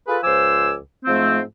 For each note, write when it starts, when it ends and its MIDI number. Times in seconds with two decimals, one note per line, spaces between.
0.08 0.18 65
0.08 0.18 68
0.08 0.18 69
0.08 0.18 71
0.24 0.74 37
0.24 0.74 53
0.24 0.74 72
0.24 0.74 80
0.24 0.74 86
0.24 0.74 88
1.05 1.41 44
1.05 1.41 53
1.05 1.41 57
1.05 1.41 60